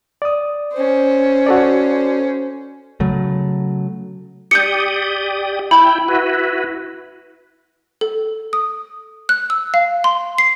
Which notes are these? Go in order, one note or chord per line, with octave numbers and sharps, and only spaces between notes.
D5 D#6
C#4 C5
F#4 A4 D5
C#3 F#3 A3
G4 D5 D#6 G6 C#7
E4 G5 B5
E4 F#4 B4
A4
D#6
F#6
E6
F5
C6
C7